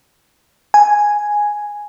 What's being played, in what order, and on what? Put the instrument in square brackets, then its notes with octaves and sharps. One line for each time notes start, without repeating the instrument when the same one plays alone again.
[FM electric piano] G#5